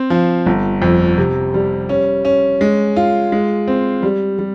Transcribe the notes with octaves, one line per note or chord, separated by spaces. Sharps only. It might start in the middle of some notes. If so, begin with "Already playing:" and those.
Already playing: C4
F3
G1
F2
C3
G3
C#4
C#4
G#3
F4
G#3
C4
G3
G3